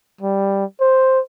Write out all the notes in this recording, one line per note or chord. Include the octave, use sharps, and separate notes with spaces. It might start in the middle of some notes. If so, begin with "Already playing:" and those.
G3
C5